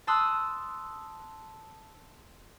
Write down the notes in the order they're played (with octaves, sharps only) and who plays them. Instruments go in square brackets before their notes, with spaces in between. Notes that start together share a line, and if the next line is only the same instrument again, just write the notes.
[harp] A5 C6 D#6 E6 F#6